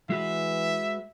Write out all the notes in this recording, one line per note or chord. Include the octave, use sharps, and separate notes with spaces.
E3 G#3 F#4 B4 E5